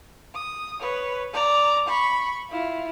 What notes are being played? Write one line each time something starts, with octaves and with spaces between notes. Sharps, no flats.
D#6
B4 C#5
D5 A#5
B5 C#6
E4 F4